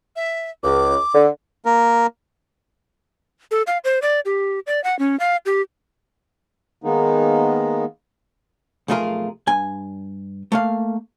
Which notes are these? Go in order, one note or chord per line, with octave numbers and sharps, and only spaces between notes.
E5
C#2 D6
D3
A#3 A#4
A4
F5
C5
D5
G4
D5
F#5
C#4
F5
G4
D#3 G#3 A#3 B3 D#4
B1 F2 A3 F4 G#4 A#4
G2 G#5
A3 A#3 F5